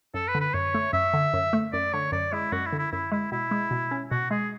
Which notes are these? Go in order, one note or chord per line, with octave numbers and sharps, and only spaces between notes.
F#2 A4
B4
D3
B4
F#2 C#5
A3
F#2 E5
D3
F#2
A3
F#2 D5
D3 C#5
F#2 D5
G#3 E4
F#2 F#4
E4
D3
E4
F#2 E4
G#3 E4
B2 E4
G#3
B2
C#4
B2 F#4
G#3 G#4